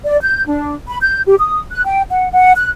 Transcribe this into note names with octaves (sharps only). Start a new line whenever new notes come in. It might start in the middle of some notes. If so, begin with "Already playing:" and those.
D5
G6
D4
B5
G6
G4
D#6
F#6
G5
F#5
F#5
F#6